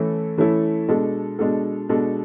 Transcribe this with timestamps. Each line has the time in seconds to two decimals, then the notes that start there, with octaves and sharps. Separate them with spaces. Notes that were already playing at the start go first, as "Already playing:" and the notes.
Already playing: E3 A3 C#4 E4 A4
0.38 E3 A3 C#4 E4 A4
0.88 B2 G#3 D4 A4
1.39 B2 G#3 D4 A4
1.89 B2 G#3 D4 A4